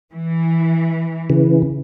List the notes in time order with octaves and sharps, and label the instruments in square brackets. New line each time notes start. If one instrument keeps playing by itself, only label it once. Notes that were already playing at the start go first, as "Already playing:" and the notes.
[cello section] E3
[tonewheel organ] C#3 E3